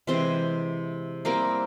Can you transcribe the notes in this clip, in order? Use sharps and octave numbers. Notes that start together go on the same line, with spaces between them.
C3 E3 G#3 C4 C5
G3 A#3 C4 E4 A#4